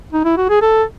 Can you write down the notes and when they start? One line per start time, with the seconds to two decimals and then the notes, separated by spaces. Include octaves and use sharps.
0.13 D#4
0.25 E4
0.37 F#4
0.50 G#4
0.62 A4